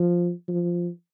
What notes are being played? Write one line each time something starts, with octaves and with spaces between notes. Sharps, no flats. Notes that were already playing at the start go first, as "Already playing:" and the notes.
Already playing: F3
F3